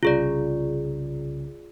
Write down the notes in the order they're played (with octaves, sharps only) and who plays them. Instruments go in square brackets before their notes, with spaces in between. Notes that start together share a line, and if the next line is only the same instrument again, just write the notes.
[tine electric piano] C2 C#3 [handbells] F4 G#4 D5